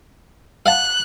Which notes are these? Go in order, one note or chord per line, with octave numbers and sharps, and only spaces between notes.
F5 F#5 A5 F#6